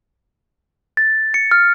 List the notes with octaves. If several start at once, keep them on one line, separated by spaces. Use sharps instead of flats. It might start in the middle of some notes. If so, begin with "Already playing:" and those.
A6
C#7
F6